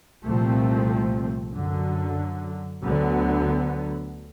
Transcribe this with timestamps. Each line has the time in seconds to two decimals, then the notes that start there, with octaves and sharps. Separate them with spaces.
0.24 C2 A#2 F3 A3 C4
1.53 F#2 D3 F#3
2.83 D2 D3 F#3 B3